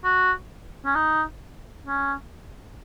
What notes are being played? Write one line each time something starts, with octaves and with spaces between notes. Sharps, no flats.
F#4
C#4
D#4
C#4